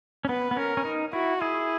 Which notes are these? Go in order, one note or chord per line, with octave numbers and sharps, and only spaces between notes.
C#4
B3 B4
B3
C#4 A#4
C#4
D#4
E4 F#4
E4 G#4